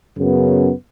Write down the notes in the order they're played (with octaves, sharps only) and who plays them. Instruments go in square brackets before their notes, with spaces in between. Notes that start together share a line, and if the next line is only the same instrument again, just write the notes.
[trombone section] F#2 C#3 B3